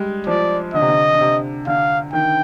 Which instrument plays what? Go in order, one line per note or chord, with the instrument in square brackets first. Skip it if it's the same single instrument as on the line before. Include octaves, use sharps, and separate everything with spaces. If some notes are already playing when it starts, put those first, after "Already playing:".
Already playing: [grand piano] G3 G#3
[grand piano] F3 [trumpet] D5
[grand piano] D3 [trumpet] D#5
[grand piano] C3
D3
D3
C3
[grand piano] D3 [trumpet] F5
[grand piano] D#3 [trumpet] G5